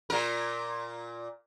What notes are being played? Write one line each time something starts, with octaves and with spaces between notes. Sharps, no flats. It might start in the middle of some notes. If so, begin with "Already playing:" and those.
A#2 A#4